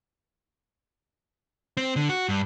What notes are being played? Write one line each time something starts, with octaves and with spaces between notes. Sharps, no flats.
C4
D3
F#4
G2